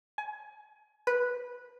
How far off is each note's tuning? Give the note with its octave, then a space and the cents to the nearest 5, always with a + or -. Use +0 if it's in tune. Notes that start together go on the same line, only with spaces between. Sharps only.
G#5 +30
B4 -10